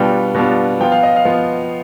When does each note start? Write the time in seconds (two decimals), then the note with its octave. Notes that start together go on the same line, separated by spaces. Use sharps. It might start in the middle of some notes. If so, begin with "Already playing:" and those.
Already playing: B2 G3 B3 D4 F4 G5
0.35 B2 G3 B3 D4 F4
0.80 F3 B3 F4 G5
0.92 F5
1.03 D#5
1.16 F5
1.25 F3 B3 F4